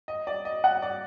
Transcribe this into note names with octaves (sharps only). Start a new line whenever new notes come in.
D#5
D5
D#5
F#5
D5